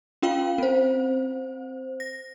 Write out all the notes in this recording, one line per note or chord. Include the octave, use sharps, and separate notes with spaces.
C#4 F4 F5 G5
C4 C5
A#6